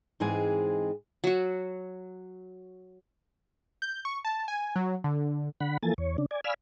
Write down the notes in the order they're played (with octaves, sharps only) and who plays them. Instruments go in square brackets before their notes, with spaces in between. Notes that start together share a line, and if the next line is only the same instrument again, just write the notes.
[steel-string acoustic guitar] G#2 E3 G#3 C4 G#4 G#5
[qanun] F#3 F#4
[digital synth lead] G6
C#6
A5
G#5
F#3
D3
[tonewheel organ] D3 F#5 B5
E3 F3 A#3 A4 G#5 A6
E2 C#5
C#3 D4
D5 G#5
D5 F5 G#5 B5 E6 F6